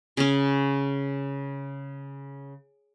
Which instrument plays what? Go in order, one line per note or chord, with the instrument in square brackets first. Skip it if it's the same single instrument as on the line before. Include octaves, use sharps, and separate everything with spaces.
[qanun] C#3 C#4